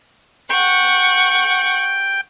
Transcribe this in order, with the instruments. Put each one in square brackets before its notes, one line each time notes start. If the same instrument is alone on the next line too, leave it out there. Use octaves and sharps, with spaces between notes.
[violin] F#5 C#6 [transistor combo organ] G5